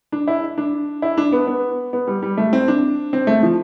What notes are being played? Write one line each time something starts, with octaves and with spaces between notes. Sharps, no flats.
D4
E4
D4
E4
D4
B3
B3
B3
G3
G3
A3
C4
D4
C4
A3
F3